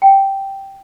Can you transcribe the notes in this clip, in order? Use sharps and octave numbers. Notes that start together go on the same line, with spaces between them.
G5